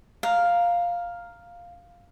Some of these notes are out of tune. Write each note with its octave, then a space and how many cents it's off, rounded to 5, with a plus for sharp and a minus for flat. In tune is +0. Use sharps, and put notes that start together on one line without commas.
F5 +0 A#5 +0